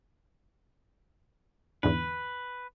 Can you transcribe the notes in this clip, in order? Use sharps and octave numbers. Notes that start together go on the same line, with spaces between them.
E2 G#2 D3 B4